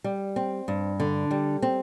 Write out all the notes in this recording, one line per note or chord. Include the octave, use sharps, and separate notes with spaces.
G3
C4
G2
D3
G3
C4